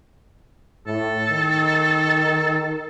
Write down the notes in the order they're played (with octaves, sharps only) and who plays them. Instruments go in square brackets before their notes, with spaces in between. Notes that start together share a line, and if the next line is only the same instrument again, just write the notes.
[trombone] A2 [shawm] A4
[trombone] D#3